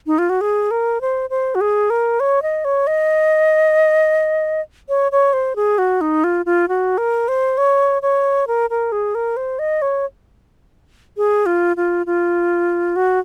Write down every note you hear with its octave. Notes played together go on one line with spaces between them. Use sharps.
D#4
F4
F#4
G#4
A#4
C5
C5
F#4
G#4
A#4
C#5
D#5
C#5
D#5
C#5
C#5
C5
G#4
F#4
D#4
F4
F4
F#4
A#4
C5
C#5
C#5
A#4
A#4
G#4
A#4
C5
D#5
C#5
G#4
F4
F4
F4
F#4